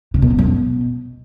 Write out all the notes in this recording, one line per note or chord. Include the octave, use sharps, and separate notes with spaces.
C#3
B2
F2
F#2
B2